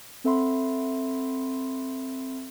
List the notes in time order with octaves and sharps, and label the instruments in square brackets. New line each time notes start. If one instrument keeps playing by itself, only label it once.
[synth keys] C4 A4 E5 F#5 B5 C6